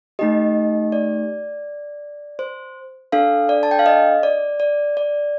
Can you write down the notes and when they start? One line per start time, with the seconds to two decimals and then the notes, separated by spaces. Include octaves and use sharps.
0.19 A3 D#4 G4 D#5
0.92 D5
2.39 C5
3.12 D4 A4 F5
3.49 D5
3.63 A5
3.71 G5
3.79 F5
3.86 D#5
4.23 D5
4.60 D5
4.97 D5